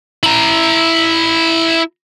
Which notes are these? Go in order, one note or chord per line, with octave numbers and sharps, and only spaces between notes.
E4 A#5